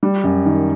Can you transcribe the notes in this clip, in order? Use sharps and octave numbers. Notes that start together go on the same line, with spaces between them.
G3
F#2
D#3